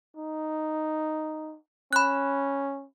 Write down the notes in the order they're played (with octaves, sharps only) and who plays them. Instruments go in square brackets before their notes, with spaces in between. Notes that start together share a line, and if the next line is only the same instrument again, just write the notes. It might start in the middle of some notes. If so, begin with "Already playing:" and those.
[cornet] D#4
[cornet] C#4 [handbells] B5 F#6